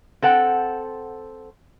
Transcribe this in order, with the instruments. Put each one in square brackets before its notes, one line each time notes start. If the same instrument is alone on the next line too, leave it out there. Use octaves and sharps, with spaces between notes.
[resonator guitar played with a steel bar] C4 A4 F#5 G5